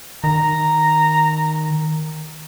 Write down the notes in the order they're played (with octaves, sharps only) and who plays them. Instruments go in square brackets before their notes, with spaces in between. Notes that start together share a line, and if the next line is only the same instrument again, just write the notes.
[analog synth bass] D#3 [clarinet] A#5